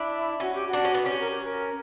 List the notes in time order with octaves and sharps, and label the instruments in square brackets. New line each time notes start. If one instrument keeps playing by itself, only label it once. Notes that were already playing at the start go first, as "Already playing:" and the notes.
Already playing: [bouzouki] D4 [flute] E4
[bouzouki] C#4 [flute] F#4
[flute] G4
F#4
[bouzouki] D4
C#4
B3
[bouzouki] C#4 [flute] G4
[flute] A#4
G4
A#4